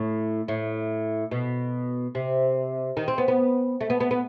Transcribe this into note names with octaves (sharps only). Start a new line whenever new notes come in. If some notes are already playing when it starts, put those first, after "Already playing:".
Already playing: A2
A2
B2
C3
D#3
C4
B3
B3
A3
B3
B3
B3